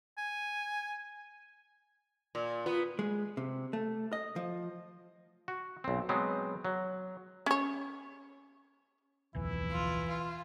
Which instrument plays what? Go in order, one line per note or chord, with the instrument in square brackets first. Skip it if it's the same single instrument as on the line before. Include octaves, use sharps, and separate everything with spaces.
[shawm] G#5
[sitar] A#2
[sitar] B3 [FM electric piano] F4
[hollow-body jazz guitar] G#3
C3
A3
D#5
F3
[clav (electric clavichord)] F#4
B1 C4
F#3 G#3 B3 C4
F#3
[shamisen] C#4 C#5
[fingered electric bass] D1 B1 F2 [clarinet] E3 [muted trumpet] E4
[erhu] F4
F4